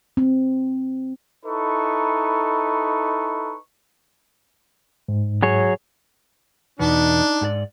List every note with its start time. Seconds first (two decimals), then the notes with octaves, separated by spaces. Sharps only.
0.17 C4
1.45 D#4 E4 A4 B4 C#6
5.09 G#2
5.43 F#3 G#4 C#5
6.79 E2 B2 B3 D4 D#4
7.41 G#2 G4 D5